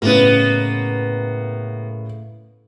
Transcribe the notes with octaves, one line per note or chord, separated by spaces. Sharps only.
A2 C#3 A#3 B3